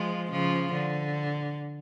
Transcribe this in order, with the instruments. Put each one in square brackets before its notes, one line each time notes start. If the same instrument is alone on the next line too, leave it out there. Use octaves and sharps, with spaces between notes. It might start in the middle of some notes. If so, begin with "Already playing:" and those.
Already playing: [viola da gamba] F3 G#3
C#3 F3
D3